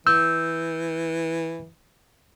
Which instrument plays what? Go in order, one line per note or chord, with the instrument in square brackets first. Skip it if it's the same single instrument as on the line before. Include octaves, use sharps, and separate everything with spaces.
[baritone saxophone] E3 [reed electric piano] E6 G6